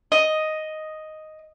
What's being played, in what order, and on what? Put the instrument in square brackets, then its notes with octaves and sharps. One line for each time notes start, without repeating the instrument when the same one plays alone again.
[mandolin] D#5